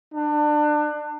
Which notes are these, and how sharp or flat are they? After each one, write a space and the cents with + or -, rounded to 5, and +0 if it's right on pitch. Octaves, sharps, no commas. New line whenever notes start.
D4 +25